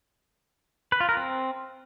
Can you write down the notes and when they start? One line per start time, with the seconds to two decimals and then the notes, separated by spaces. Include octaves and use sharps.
0.92 B4
1.00 F4
1.09 A#4
1.17 C4